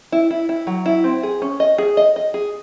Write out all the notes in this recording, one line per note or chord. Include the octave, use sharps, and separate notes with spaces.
E4
E4
E4
F#3
E4
C4
G#4
C#4
D#5
G#4
D#5
D#5
G#4